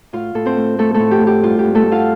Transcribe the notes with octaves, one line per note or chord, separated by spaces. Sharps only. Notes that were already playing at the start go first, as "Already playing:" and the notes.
A2 F4 F5
A2 A4
C4 C5
A3
F3 A3 A4
A2 A3 A4
G4
A2
G4
G2 F4
G4
G2
A3 A4
A3
F4 F5